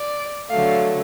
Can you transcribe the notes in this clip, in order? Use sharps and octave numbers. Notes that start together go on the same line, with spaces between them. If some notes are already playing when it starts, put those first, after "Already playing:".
Already playing: D5
D3 F#3 A3 F5